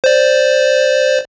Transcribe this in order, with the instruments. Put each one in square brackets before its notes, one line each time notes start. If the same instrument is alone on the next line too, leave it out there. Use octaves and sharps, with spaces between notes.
[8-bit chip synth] C5 D5